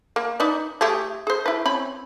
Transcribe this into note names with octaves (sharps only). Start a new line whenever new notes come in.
A#3
D#4 B4 D5
A3 G4 G#4
G#4 C5
E4 B4
C4 C#4 B5